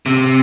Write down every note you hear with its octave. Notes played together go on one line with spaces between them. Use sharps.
C3